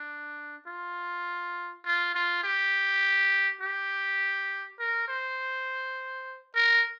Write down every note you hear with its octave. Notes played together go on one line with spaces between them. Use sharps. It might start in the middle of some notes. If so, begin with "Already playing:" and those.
Already playing: D4
F4
F4
F4
G4
G4
A#4
C5
A#4